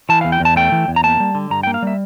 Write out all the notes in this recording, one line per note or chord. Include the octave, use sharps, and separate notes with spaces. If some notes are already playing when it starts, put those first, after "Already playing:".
E3 A5
F5
E2
G5
E2 A5
A3 G5
E3
E2
A#5
A#3 A5
G3
D3
G2 A#5
G5
A#3
F5
G3 E5